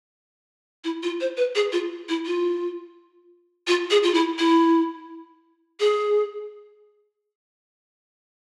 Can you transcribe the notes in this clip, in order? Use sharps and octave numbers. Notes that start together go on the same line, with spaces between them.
E4
F4
C5
B4
G#4
F4
E4
F4
F4
G#4
F4
E4
E4
G#4